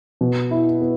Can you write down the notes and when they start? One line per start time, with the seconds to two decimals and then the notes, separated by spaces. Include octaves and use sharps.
0.21 B2
0.51 E4
0.82 B3